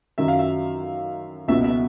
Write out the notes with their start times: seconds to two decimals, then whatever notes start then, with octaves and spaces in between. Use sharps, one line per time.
0.18 F#2 D#3 F#3 E5
0.28 F5
0.39 E5
1.48 C#2 B2 F#3 E5
1.64 E5